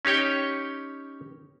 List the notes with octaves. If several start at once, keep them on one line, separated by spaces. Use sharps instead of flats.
C#4 D#4 G4 C#5 G5